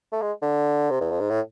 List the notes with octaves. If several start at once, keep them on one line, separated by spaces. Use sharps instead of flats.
A3
G#3
D3
C3
E2
F2
G#2
A2